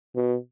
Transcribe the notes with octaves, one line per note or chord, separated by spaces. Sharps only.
B2